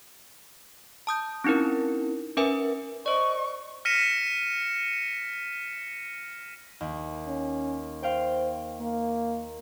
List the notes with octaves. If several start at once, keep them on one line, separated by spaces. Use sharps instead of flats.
A5 D#6 G6
C4 C#4 D#4 E4 A#4
C#4 A#4 B4 E5 G#5
C5 D5 D#5 C#6
F6 A#6 B6 C#7 D#7 E7
D#2
C#4
C5 F5 G5
A#3